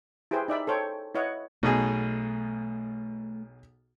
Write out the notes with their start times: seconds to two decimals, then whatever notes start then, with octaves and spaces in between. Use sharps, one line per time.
0.31 E4 G4 G#4 B4 C5 G5
0.48 D#4 D5 E5 B5
0.67 A4 C5 C#5 G5
1.15 E4 B4 C#5 D#5 F#5
1.63 B1 B2 A3 G#4